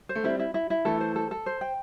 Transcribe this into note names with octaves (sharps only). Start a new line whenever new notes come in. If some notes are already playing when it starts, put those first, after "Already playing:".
C5
A3
G3 C4 E4
E4
E4
E4
E3 A3 A4
C5
A4
A4
C5
G5